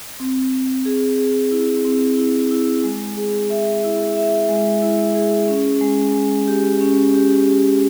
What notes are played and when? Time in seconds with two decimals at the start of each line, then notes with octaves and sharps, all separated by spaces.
0.20 C4
0.53 C4
0.85 G#4
1.18 G#4
1.51 E4
1.85 C4
2.18 E4
2.51 E4
2.84 G#3
3.17 G#4
3.50 E5
3.84 E4
4.17 E5
4.49 G#3
4.83 E4
5.15 G#4
5.48 C#4
5.81 G#3
6.14 G#3
6.48 G4
6.81 C#4
7.15 G4
7.46 G4